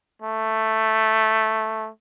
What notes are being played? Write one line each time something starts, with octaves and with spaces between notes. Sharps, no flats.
A3